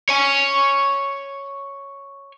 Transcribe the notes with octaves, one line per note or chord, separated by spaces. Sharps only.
C#5 G#5